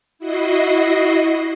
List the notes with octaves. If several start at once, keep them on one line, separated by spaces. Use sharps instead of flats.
E4 F#4 D#5 C7